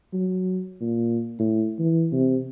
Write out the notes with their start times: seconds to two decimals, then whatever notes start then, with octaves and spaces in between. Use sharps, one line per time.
0.14 F#3
0.81 A#2
1.39 A2
1.79 E3
2.12 C3